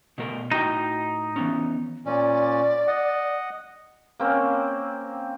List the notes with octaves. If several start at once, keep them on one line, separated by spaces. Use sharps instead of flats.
B2 A3 A#4
A2 D#4 F#4 G5
E3 B3 C#4
A#2 C#4 D5
D#5 F#5
A#3 C4 C#4